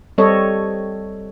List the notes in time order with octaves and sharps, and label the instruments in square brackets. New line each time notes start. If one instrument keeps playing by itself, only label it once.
[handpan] G3 C4 A4 C#5 D#5